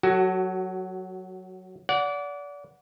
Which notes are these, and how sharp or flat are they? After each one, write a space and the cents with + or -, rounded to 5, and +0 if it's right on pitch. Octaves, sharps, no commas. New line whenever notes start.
F#3 +0 F#4 +25 A4 +25
D5 -30 F#5 -10